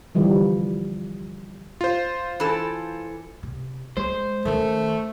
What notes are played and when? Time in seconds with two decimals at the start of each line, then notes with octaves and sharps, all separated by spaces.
0.15 D3 E3 F3 G3
1.81 F4 C5
2.40 E3 A4
3.43 C3
3.97 G#3 C5
4.45 D#3 A3 C#4